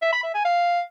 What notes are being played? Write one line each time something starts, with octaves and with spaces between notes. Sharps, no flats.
E5
B5
E5
G#5
F5